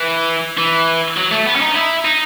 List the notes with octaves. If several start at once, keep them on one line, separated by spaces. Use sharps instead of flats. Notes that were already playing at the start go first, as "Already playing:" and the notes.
Already playing: E3
E3
F#3
A3
B3
C#4
D#4
E4
D#4